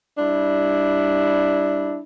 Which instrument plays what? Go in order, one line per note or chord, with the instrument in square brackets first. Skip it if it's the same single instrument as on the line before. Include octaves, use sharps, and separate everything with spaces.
[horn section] G3 D4 E4